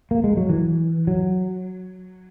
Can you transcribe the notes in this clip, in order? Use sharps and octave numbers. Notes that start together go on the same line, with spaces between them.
A#3
G#3
F#3
E3
F#3